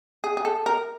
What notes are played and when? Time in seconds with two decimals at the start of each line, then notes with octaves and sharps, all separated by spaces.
0.24 G#4
0.37 G#4
0.45 A4
0.66 A#4